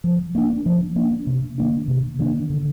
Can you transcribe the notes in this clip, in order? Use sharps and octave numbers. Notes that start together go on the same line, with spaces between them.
F3
A#3 D4
F3
A#3 D4
C3
D#3 A#3 D4
C3
D#3 A#3 D4
D3